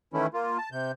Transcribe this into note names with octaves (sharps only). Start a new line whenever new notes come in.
D#3 E3 A3 C#4 E4
A#3 F4
A5
C3 G6